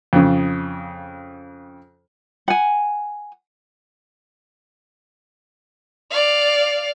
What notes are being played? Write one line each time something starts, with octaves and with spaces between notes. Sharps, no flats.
F2 C#3
F#5 G#5
D5 F5